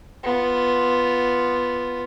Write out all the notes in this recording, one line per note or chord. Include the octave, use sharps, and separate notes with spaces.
B3 F4